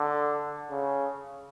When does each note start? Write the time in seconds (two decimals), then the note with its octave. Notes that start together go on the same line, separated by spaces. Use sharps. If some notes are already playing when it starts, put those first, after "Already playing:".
Already playing: D3
0.71 C#3